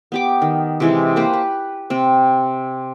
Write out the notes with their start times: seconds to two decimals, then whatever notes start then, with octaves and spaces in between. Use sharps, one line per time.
0.12 B3 G4 D6
0.42 D#3
0.80 C3 E3 G#3
1.16 A#3 G4 B4 C5
1.33 B4
1.90 C3 C4